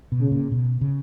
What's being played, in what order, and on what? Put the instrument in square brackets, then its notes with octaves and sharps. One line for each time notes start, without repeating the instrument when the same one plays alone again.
[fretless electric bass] B2
[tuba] C#3
[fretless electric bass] A#2
B2
C#3